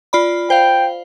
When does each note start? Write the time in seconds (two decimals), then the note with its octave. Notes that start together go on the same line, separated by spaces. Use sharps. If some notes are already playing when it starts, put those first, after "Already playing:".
0.13 F4 D5 B5
0.50 C5 F5 G5